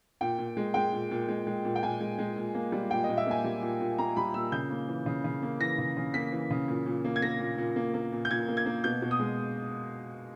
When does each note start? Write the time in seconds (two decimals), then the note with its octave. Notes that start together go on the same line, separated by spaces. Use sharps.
0.21 A#2 G5
0.38 A#2
0.57 G#3
0.74 G#3 G5
0.93 A#2
1.11 A#2
1.28 G#3
1.47 G#3
1.65 A#2
1.76 G5
1.83 A#2 G#5
2.01 G#3
2.19 G#3
2.36 A#2
2.55 A#3
2.72 G3
2.90 A#2 G5
3.04 D#5
3.09 A#2
3.17 E5
3.27 A#3 G#5
3.44 G3
3.62 A#2
3.81 A#2
3.98 A#3 A#5
4.16 G3 B5
4.34 A#2 E6
4.52 C#3 G6
4.70 A#3
4.88 E3
5.06 C#3
5.24 C#3
5.42 A#3
5.60 E3 A#6
5.78 C#3
5.97 C#3
6.14 A#3 B6
6.32 E3
6.51 C#3
6.68 A#2
6.86 A#2
7.04 A#3
7.16 G#6
7.22 A#3 A#6
7.40 A#2
7.58 A#2
7.76 A#3
7.94 A#3
8.12 A#2
8.25 G6
8.30 A#2 G#6
8.48 A#3
8.57 G#6
8.66 A#3
8.84 B2 G6
9.02 B2
9.11 D#6
9.20 G#3